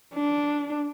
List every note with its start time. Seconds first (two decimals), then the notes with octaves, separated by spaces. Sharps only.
0.15 D4